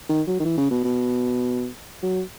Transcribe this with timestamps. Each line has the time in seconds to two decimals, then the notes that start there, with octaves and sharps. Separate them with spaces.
0.09 D#3
0.27 F#3
0.40 D#3
0.45 E3
0.57 C#3
0.71 B2
0.84 B2
2.03 F#3